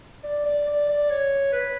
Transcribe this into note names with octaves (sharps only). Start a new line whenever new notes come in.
D5
D5
D5
D5
C#5
B4